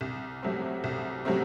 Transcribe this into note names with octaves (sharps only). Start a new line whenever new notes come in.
C2
C3 F#3 A3 C4
C2
C3 F#3 A3 C4